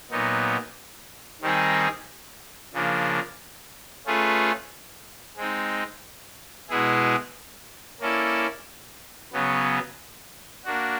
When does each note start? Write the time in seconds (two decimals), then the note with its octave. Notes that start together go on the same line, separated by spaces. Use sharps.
0.10 A#2 F#3 B3 D#4
1.41 D#3 G3 C4 D#4 G#4
2.74 C#3 F3 A#3 D4
4.06 A3 C#4 F4 G#4 B4
5.37 G#3 C4 D#4
6.69 B2 G#3 B3 E4 G#4
8.00 A#3 C#4 E4 A4 D5
9.33 C#3 F#3 B3
10.65 A#3 D4 F#4